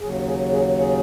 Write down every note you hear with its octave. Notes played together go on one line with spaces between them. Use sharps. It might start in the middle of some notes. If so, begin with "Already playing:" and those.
D#2 C#3 F#3 G#4
G#4
G#4
G#4